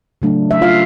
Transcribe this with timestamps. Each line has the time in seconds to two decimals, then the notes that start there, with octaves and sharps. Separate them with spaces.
0.22 C#3 F#3 A3 D4
0.51 E5
0.61 F4 F5